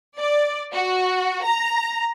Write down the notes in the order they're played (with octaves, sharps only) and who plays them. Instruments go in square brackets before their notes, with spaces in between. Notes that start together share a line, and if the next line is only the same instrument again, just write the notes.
[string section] D5
F#4
A#5